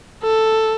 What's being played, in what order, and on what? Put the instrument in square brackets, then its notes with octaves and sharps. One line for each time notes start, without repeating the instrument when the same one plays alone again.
[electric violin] A4